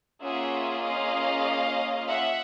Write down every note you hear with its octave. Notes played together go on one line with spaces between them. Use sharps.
A#3 C#4 F4 G#4 E5 F#5
D#5 F5
E5 F#5